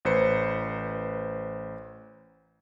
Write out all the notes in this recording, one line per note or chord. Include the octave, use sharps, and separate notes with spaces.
A1 B4 C5 C#7